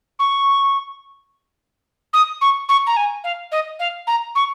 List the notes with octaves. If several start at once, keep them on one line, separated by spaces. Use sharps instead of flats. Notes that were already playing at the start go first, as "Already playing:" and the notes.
C#6
D#6
C#6
C#6
A#5
G#5
F5
D#5
F5
A#5
C#6